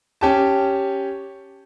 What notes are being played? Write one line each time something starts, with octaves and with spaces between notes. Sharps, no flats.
C#4 G4 A5